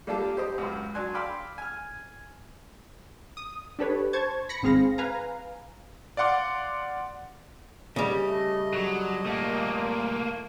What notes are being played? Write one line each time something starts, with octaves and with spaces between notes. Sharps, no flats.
G3 A#3 D4 F4 G4 A4
G4 C5 D#5
C#2 F#2
F#3 D4 G#5 C6 F#6
D5 F5 G5 B5 C6 E6
G#5 F6
D#6
D4 G4 A4 B4 C#5
C5 A5 C#6 G#6
B5 A#6 C#7
G#1 C4 G#4 F5 A#6
B4 F5 G#5 A#5
D5 F5 F#5 C6 D6
C#3 G3 D#5
A3
D3 F#3
A#2 A3 A#3